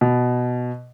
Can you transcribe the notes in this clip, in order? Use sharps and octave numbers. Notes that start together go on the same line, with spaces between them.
B2